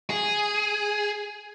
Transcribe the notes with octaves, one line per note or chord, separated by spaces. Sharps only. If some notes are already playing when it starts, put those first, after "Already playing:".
G#4